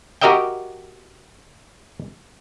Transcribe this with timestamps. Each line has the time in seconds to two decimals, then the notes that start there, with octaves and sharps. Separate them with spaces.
0.21 F#4 G4 A#4 D#5 E5 G5